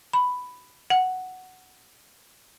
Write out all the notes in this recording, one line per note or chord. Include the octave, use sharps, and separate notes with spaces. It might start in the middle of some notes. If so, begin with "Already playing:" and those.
B5
F#5